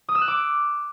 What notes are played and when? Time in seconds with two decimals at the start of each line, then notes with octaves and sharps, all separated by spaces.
0.09 D#6
0.15 E6
0.21 F#6
0.28 D6